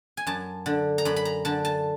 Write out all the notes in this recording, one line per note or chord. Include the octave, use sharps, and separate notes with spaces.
G#5
F#2 A5
D3
A#5
F#2 B5
B5
A#5
D3 A5
A5